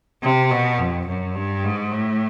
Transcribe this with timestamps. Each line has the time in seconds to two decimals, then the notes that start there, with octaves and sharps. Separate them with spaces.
0.23 C3
0.51 B2
0.78 F2
1.08 F#2
1.35 G2
1.64 G#2
1.92 A2